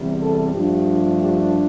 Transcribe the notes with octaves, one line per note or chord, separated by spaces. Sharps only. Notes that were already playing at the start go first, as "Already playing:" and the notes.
Already playing: E2 C3 G3
A4
G2 F3 A3 D4 G4
G4